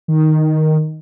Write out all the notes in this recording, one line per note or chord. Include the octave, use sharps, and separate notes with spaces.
D#3